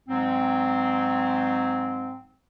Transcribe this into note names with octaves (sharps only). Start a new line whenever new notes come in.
G#2 F#3 G#3 C4